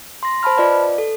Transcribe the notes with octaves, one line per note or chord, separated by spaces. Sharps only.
C6 A#6
C5 A5 B5 F6
F4 B4 D5 D#5
A4